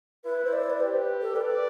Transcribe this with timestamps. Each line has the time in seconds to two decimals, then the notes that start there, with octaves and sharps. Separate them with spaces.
0.25 E4 B4
0.45 C5
0.53 D5
0.70 B4
0.80 G4 C5
0.95 B4
1.22 A4
1.36 B4 D5